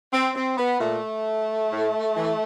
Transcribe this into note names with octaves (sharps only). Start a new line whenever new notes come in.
C4
C4
B3
A#2 A3
A2
E3